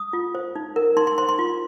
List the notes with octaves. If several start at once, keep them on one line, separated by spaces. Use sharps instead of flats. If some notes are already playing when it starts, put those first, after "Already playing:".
Already playing: D#6
F4
C5
D#4
A#4
D#4 C6
C6
C5 C6
C6
F4